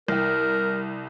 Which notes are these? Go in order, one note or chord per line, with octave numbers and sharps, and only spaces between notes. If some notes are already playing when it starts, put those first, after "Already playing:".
C2 A#4 G5